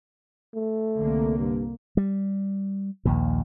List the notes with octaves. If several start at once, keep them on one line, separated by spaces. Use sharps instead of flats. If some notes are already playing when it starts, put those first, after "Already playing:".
A3
C2 D3 A#3
G2
G3
A#1 D#2 A#2